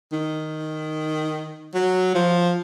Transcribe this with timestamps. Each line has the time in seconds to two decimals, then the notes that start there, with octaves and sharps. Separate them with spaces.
0.13 D#3
1.74 F#3
2.14 F3